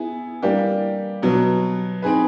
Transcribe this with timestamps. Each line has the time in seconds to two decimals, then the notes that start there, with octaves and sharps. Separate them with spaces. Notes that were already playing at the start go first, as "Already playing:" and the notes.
Already playing: B3 E4 G#4
0.42 E3 G3 A#3 D4 G4
1.22 B2 F#3 B3
2.02 C4 D#4 G#4 B4